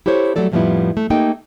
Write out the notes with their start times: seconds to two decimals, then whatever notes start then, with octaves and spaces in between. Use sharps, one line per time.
0.06 E4 G4 A4 C5 C#5
0.36 F#3 G3 A3 A4 D5
0.52 F2 A2 F3 G3 B3 E4
0.97 A3
1.10 A3 A#3 D#4 G4 A4 G5